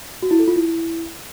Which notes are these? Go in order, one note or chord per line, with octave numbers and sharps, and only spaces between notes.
F#4
E4
A4
F4
E4